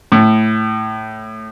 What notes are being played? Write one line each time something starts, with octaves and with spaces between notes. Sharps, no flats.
A2